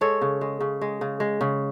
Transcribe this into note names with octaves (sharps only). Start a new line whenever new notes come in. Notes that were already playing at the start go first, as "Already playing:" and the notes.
G#3 A4 C#5
C#3
G#3
C#3
G#3
C#3
G#3
C#3